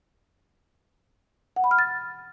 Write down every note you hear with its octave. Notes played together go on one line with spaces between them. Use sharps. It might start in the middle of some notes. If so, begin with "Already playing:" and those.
F#5
B5
F6
A6